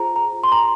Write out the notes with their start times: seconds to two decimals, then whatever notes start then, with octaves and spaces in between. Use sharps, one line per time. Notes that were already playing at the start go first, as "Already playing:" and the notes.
Already playing: F4 G#4 C5 A#5
0.16 A#5
0.44 C6
0.52 A#5